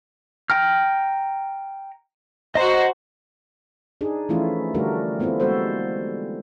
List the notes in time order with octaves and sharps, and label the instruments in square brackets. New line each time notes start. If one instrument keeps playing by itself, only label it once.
[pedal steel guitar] G5 A#5 F6
[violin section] F#4 C5 [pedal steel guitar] D#5 A#5
[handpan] D4 D#4 G#4
E3 F3 A3 C#4 E4 F4
D3 G3 A3 D4 F#4 A#4
A3 B3 C4 E4 F4
G3 G#3 B3 F#4 A4 C5